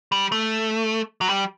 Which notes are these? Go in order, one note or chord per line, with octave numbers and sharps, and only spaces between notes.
G3
A3
F#3
G3